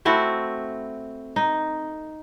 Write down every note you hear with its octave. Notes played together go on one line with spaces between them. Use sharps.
A3 C4 E4 F#4
D#4